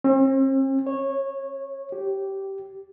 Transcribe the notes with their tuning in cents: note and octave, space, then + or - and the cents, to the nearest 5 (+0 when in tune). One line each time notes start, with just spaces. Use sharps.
C4 +45
C#5 -15
G4 -15